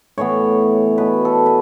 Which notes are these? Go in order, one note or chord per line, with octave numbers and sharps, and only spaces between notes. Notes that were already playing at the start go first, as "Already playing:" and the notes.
A2 E3 B3 C#5
B2 B3 B4
A4
B4